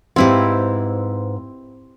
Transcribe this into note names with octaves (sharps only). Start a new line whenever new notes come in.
G#2 C4 E4 G4 B4 F5